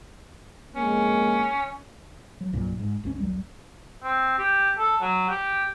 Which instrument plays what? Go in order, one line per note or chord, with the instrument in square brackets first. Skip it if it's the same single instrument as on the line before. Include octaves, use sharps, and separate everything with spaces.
[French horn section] F2 G#3 A#3 [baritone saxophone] C#4
[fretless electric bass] F#3
C2 G2 A#2 F#3
G#2
G1 D2 C#3 C#4
A#1 D#2 F#3 G3
[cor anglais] C4
G4
A4
F#3
G4